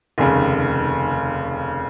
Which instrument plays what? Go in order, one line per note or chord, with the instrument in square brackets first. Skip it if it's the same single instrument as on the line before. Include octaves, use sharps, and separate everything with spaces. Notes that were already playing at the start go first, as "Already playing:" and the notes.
[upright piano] F1 D#2 C#3